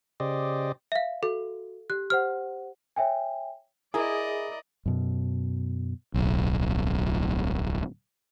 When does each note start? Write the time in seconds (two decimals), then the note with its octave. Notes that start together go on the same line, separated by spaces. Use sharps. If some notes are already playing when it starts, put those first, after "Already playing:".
0.20 C#3 G4 C5 D5 D#5
0.92 E5 F5
1.23 F#4 A4
1.90 G4 F#6
2.10 G4 C5 F#5 F6
2.96 C#5 E5 G5 G#5
3.94 E4 G#4 A#4 D5 D#5
4.86 F#2 B2
6.14 D1 B1